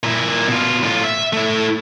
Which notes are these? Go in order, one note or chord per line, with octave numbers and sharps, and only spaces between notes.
A#2 E4
B2 F4
A2 F4
E5
A3 E4